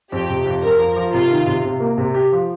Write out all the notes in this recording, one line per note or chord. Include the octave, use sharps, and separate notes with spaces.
F2 G4
C3
F2
F2 A#4
F3
F3
C3 F4
D#3
C3
C3
A#3
C3
G4
F3